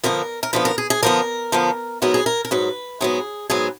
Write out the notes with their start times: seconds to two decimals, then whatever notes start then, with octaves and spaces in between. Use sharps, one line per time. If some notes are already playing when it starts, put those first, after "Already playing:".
0.04 D3 F3 B3 A#4
0.43 A#4
0.53 D3 F3 B3 B4
0.65 A#4
0.78 G#4
0.90 G#4
1.03 D3 F3 B3 A#4
1.52 D3 F3 B3
2.02 G#2 F#3 B3 A#4
2.14 G#4
2.26 A#4
2.45 A#4
2.51 G#2 F#3 B3 B4
3.01 G#2 F#3 B3 G#4
3.50 G#2 F#3 B3 G#4